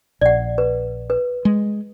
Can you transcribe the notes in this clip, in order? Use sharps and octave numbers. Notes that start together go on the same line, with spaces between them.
A#1 D5 F#5
B4
B4
G#3